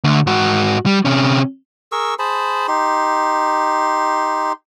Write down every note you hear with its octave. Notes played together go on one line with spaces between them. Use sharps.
D2 D3
G#2 F#4
G3
C3 C#4
G#4 A#4 C#6 E6
G#4 C5 A5 B5
D#4 G4 C6